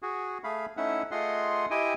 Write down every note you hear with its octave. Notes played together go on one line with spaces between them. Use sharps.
F#4 G#4
A3 G#4 F5 B5
A3 C#4 D#4 E4 E5 F#5
A3 F4 G#4 D#5 F#5 C6
E4 G4 D#5 G5 G#5